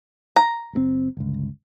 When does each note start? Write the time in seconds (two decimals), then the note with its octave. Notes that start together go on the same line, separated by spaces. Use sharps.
0.36 A#5
0.73 F#1 A#2 C4
1.17 G1 C#2